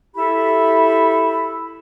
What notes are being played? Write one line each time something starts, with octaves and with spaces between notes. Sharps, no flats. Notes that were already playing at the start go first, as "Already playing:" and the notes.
E4 G4 A4 E5 B5